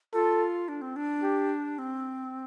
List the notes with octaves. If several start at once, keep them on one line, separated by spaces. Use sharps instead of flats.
F4 A4
D4
C4
D4
G4
C4